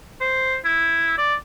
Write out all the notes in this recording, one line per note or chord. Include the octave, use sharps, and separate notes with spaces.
C5
E4
D5